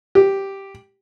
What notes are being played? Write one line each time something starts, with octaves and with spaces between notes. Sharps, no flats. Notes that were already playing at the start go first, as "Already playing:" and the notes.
G4